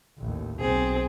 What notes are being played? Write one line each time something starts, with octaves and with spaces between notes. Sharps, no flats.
A1 D#2
B1 C4 G#4